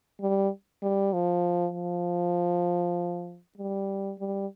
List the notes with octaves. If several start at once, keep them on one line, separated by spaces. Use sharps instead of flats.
G3
G3
F3
F3
G3
G3